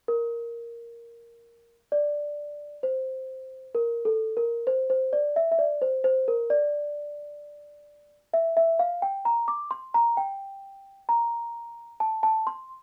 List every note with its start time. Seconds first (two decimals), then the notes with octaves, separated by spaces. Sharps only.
0.08 A#4
1.92 D5
2.83 C5
3.75 A#4
4.05 A4
4.37 A#4
4.67 C5
4.90 C5
5.13 D5
5.36 E5
5.52 E5
5.59 D5
5.82 C5
6.04 C5
6.28 A#4
6.50 D5
8.33 E5
8.57 E5
8.79 F5
9.02 G5
9.25 A#5
9.48 D6
9.71 C6
9.94 A#5
10.17 G5
11.09 A#5
12.00 A5
12.23 A5
12.47 C6